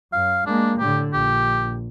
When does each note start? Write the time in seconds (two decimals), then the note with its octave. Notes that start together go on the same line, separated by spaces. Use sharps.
0.12 F#2 F5
0.46 G#3 A#3 D4
0.79 A2 D3 G4
1.13 A#1 G4